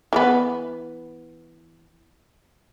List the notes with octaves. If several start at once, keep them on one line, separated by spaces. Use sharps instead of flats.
E3 A#3 B3